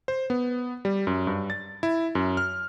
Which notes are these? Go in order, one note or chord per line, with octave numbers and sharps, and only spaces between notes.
C5
B3
G3
F#2
G2
A6
E4
F#2
F6